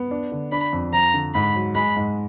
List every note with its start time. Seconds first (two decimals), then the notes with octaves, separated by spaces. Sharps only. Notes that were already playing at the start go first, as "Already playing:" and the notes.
Already playing: B3
0.11 D4
0.32 D3
0.52 D4 B5
0.73 F2
0.92 F3 A#5
1.14 D3
1.34 G#2 B5
1.55 F#3
1.75 G#3 B5
1.96 G#2